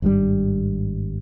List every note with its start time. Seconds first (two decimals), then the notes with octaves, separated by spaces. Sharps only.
0.02 G#1 G2 D#3 G3